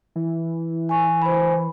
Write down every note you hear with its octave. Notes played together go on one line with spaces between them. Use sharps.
E3
G#5 C#6
C5 G#5 B5